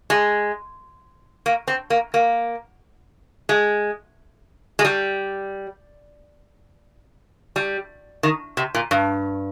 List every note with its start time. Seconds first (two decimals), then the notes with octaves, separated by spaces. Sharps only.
0.10 G#3
1.46 A#3
1.68 C4
1.90 A#3
2.14 A#3
3.49 G#3
4.79 G#3
4.85 G3
7.56 G3
8.23 D#3
8.57 C3
8.75 A#2
8.91 G2